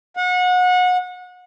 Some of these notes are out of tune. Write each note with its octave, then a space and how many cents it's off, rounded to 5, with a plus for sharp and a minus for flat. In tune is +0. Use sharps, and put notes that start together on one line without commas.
F#5 -30